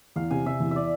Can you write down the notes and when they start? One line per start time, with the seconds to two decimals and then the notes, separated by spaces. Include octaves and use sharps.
0.16 E2 F5
0.31 C3 G#5
0.46 C3 E5
0.60 E2
0.71 D5 E5